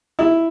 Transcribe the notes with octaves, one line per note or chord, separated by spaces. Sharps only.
E4